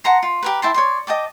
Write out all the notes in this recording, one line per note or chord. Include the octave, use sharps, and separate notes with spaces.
F#5 A5 A#5 C6
F4
G4 A#4 B4
E4 G5 A5 C6
C#5 D5 C6
D#5 G5 A5 D6